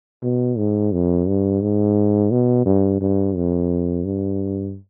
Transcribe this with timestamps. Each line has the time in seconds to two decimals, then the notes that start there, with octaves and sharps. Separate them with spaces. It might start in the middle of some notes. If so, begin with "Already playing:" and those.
0.23 B2
0.58 G#2
0.93 F2
1.28 G2
1.62 G#2
2.31 B2
2.66 G2
3.01 G2
3.36 F2
4.05 G2